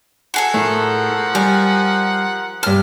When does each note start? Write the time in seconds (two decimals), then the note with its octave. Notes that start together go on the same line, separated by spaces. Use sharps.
0.34 F#4 G#4 A4
0.54 A2 F3 A3 A#4 F#5
1.35 G3 G#5
2.63 G2 A5 F6